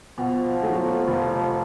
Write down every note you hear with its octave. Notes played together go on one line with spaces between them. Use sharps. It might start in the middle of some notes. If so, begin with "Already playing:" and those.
B2 F3
F#3 A3
F1